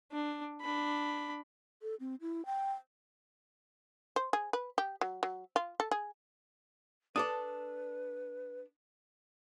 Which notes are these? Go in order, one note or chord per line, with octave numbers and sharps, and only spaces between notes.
D4
D4 B5
A4
C4
E4
G5
C5
G#4
B4
G4
F#3
F#3
F4
A4
G#4
D4 A4 B4 D5 D#6